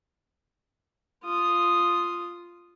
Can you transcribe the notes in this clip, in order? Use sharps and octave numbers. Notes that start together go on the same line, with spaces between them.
F4 D#6